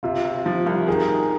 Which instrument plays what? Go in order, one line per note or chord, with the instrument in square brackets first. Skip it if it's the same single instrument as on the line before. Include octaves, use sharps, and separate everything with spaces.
[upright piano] C3 [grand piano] F4
[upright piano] C3
F3
C2
[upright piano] D#3 [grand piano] G#4
[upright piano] D#3